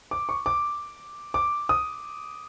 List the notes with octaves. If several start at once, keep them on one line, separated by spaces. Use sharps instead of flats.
D6
C#6
D6
D6
D#6